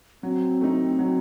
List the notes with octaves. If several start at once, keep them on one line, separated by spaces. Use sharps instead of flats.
F#3 C4
A3 D#4
F#3